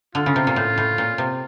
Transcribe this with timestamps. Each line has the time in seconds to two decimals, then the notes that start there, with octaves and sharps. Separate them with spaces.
0.15 D3 F4
0.26 C#3
0.36 C3
0.47 A#2
0.56 A2
0.78 A2
0.98 A#2
1.18 C3